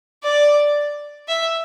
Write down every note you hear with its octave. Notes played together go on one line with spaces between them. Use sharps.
D5
E5